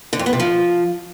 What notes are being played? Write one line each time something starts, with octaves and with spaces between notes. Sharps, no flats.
D3
F2
B3
C3
F3